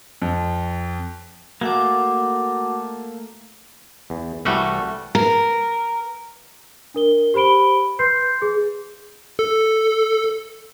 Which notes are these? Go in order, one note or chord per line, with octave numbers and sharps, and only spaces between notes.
F2
A3 A#3 F#4 F#5 D6
E2
C2 E3 G3 A3 F#4
A#4
D4 A#4 G7
G4 C5 B5 D7 G7
B4 C6 G6 C7
G#4
A4